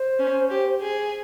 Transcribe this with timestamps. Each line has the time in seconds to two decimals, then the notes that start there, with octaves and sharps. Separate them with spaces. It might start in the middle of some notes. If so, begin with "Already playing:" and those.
Already playing: C5
0.19 C#4
0.50 G4
0.81 G#4